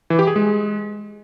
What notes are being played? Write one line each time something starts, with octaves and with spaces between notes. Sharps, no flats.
E3
G4
G#4
G#3